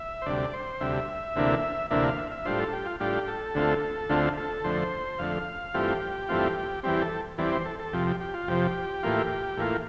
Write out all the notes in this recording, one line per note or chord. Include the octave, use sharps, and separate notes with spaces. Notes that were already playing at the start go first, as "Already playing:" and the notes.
Already playing: E5
C5
D2 C3 G3 D5
C5
D2 C3 G3 E5
D2 C3 E3 A#3 D4
D2 C3 E3 A#3 D4 E5
F5
E5
E5
A2 G3 D4 F4 C5
A4
G4
F4
A2 G3 D4 F4 G4
A4
D2 D3 A3 C4 F4
D2 D3 A3 C4 F4
A4
F2 D3 A3 C5
F2 D3 A3 F5
G2 E3 A3 C4 F4 G4
G2 E3 A3 C4 F4
E2 E3 G3 C4 G4
A4
E2 E3 G3 C4 D5
C5
A4
A4
F2 C3 F3 G4
G4
G4
F4
F2 C3 F3 G4
A2 E3 A#3 F4
A2 E3 A#3 F4